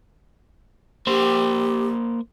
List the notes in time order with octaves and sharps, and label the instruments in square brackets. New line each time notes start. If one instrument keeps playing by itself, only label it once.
[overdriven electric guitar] A#3 C5 [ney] G4